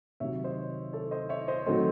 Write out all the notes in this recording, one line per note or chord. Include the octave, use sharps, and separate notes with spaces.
C3 D#3 F#3 C#5 E5
C5 D#5
A4 C#5
C5 D#5
C#5 E5
C5 D#5
D#3 F#3 A3 C4 C5 D#5